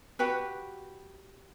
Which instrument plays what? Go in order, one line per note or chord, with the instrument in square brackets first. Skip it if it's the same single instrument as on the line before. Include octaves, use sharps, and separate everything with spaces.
[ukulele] F#4 G4 B4